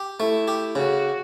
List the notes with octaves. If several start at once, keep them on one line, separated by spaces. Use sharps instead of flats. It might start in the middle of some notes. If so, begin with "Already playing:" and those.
Already playing: G4
A3 E4
G4
C#3 F#4